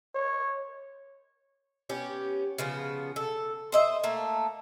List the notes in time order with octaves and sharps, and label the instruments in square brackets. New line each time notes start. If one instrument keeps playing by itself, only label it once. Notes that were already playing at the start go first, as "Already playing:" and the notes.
[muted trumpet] C#5
[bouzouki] B3 C#4 G4
C#3 F3 B3
A4
C5 D#5 E5
A3 A#3